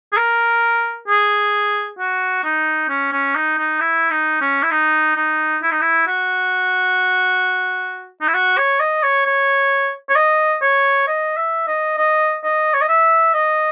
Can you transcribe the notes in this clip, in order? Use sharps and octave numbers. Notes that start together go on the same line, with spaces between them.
G#4
A#4
G#4
F#4
D#4
C#4
C#4
D#4
D#4
E4
D#4
C#4
E4
D#4
D#4
E4
D#4
E4
F#4
D#4
E4
F#4
C#5
D#5
C#5
C#5
C#5
D#5
C#5
D#5
E5
D#5
D#5
D#5
C#5
D#5
E5
D#5